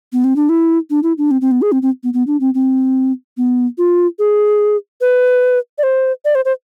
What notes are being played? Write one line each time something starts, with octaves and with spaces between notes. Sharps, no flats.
B3
C4
D4
E4
D4
E4
D4
C4
C4
B3
G#4
C4
C4
B3
B3
D4
C4
C4
B3
F4
G#4
B4
D5
C5
D5
C5
C5